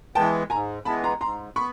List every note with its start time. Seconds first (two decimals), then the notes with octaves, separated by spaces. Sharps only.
0.15 E3 G#3 B3 G5 A5
0.50 G#2 G#5 A#5
0.85 E3 G#3 B3 A5 B5
1.04 A#5 C6
1.21 G#2 A#5 C6
1.56 B3 B5 C#6